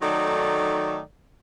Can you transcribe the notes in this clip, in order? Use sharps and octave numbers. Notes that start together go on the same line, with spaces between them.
D#3 F#3 A3 D#4 A4 D5